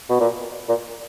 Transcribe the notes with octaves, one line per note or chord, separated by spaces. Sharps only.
B2
A#2
A#2